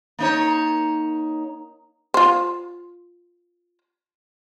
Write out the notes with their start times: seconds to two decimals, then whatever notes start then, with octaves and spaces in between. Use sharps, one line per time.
0.19 A#3 D#4 C#5
2.14 F4 C5